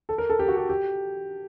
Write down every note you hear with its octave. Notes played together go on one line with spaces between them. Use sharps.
A4
A#4
A4
G4
F#4
G4
G4